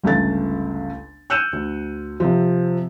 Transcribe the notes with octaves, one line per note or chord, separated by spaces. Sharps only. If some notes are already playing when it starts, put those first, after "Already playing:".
G1 C#2 A3 A6
E6 F#6 G6 C#7 D#7 E7
D2
C3 F3